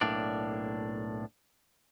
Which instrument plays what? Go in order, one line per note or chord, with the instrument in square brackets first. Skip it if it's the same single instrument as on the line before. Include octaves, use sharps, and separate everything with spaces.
[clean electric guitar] B1 A2 A#3 D4 D5